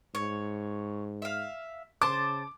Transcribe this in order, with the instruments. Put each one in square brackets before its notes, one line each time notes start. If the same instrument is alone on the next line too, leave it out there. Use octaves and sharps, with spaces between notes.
[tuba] G#2 [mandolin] C#5
[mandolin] E5 F5
[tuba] C#3 [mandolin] C5 A5 [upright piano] D6